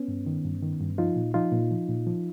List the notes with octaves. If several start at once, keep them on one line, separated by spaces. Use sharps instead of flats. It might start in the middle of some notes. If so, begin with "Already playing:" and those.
Already playing: B3 C#4
G2
D#3
G2
D#3
G2
F3 D#4 F4
A#2
F3 D#4 F4
A#2
F3
A#2
F3